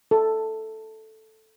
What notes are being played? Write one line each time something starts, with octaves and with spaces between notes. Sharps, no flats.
A4